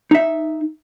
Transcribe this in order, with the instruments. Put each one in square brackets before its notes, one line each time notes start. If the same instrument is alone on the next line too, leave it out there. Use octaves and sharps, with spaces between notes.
[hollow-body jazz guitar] D#4 E5